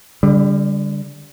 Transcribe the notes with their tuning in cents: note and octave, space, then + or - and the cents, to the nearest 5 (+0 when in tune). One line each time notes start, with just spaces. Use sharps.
D3 -20 G3 +25